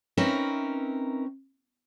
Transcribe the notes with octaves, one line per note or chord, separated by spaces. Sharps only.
C4 C#4 D#4 A#4 B4 E5